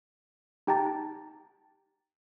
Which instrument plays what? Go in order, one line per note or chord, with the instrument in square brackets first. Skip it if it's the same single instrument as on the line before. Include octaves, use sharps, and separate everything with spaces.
[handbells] D#4 G4 G5 A5 A#5 A6